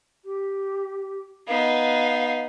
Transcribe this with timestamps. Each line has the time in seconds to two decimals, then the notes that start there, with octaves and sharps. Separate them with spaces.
0.25 G4
1.48 B3 D#4 F5